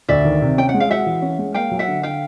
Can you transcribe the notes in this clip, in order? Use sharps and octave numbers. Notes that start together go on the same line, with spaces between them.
D2 D5 E5
D#3
C3
C#4 G5
F#5
G#3
F5
F#4 E5 F#5
E3
C#4
G#3
A#3 F5 G5
F#3
E5 F#5
D3
D3 F5 G5